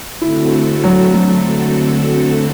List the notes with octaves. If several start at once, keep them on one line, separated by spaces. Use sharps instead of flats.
D3 A3 C4 E4 F#4 A4
F#3
F#3